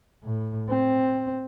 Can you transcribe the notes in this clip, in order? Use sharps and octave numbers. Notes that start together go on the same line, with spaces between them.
A2
C4